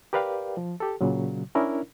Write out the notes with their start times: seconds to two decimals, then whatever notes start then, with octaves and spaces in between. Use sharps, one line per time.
0.13 G4 A#4 B4 D5 F5 G5
0.57 F3
0.80 G4 A4
1.01 A#2 C#3 F#3
1.55 C#4 D4 E4 A#4